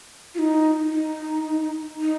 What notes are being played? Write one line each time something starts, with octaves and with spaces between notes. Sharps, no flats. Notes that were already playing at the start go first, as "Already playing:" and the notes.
F4
D#4
D#4
D#4